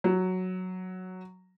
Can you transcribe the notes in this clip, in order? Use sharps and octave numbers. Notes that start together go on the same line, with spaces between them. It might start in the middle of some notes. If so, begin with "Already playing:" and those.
F#3